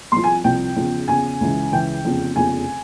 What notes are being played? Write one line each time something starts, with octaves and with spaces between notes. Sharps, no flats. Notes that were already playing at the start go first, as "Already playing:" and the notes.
C2 C3 F3 C6
G#5
C2 C3 F3 G5
E2 C#3 F3
E2 C#3 F3 G#5
C#2 C#3 E3
C#2 C#3 E3 G5
F1 E2 C#3 F3
F1 E2 C#3 F3 G#5